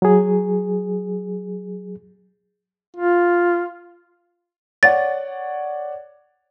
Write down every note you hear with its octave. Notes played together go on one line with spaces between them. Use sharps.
F#3 G#4
F4
C#5 D5 F#5 A6